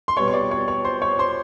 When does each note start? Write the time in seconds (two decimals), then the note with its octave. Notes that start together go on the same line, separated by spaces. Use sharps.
0.08 C6
0.17 B2 G3 B3 C#5 C#6
0.28 C#6
0.33 D5 D6
0.51 C#5 C#6
0.68 C#5 C#6
0.85 C5 C6
1.02 C#5 C#6
1.19 C5 C6